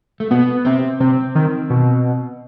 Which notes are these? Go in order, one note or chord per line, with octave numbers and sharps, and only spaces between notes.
A3
B2 B3
C3 C4
C3 C4
D#3
B2